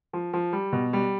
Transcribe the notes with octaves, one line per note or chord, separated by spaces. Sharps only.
F3
F3
G3
B2
G3